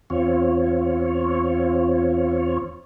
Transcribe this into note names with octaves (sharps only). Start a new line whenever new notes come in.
E2 C4 F4 C#5